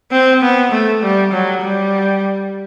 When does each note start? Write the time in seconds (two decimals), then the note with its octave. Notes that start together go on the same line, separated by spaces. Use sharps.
0.12 C4
0.42 B3
0.72 A3
1.03 G3
1.33 F#3
1.62 G3